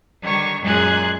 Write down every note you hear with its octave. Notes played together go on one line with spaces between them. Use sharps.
D3 D#3 G3 C#5 C#6
F#2 A#2 G#3 G#4 F#6 G#6